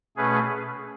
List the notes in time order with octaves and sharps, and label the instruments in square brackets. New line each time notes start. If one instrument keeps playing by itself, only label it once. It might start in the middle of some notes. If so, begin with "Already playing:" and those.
[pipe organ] B2 A3 C#4 G#4 B4